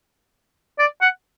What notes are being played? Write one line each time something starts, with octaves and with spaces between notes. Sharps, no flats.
D5
F#5